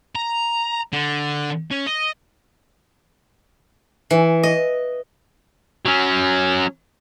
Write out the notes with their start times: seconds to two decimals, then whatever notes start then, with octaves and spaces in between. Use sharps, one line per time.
0.15 A#5
0.93 D3
1.71 C#4
1.87 D#5
4.11 E3
4.43 D#5
5.85 F#3 C#4